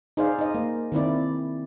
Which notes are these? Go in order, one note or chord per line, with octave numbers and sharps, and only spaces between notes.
D#4 G#4 C5 D5 F5
D#4 D#5
A#3
D#3 C4 E4 D5